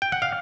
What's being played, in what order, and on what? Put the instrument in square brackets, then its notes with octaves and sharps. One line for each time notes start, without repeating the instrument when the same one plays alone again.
[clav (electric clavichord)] G5
F#5
F5